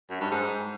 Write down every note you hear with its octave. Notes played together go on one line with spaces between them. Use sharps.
F#2
G2
G#2